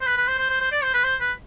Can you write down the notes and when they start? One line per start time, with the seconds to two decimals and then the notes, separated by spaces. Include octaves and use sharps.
0.01 C5
0.06 B4
0.17 B4
0.28 C5
0.39 C5
0.50 C5
0.61 C5
0.72 D5
0.83 C5
0.94 B4
1.04 C5
1.20 B4